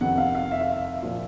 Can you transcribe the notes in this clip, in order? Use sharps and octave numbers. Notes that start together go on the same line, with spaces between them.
F2 C3 D#3 F#5
F5
F5
E5
F5
E5
A#2 F3